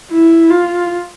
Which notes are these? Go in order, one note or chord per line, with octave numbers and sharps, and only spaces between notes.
E4
F4